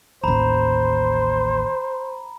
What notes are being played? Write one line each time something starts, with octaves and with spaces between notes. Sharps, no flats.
A1 D#2 C5 A#5 B5